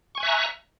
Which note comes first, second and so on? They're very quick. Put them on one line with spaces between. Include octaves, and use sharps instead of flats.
C#6 G#5 F#6 E5 A#5